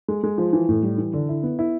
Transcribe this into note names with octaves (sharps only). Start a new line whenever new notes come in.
G#3
G#3
F3
E3
A2
G3
E3
D3
E4
B3
E4